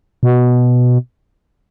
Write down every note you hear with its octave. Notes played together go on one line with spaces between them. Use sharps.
B2